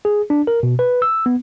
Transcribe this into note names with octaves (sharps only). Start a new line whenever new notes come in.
G#4
D4
A#4
B2
B4
E6
B3